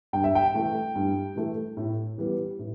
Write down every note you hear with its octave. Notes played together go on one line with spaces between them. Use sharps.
G2 G5
E5
G5
E3 A3
G2
E3 A3
A2
E3 G3 B3
A2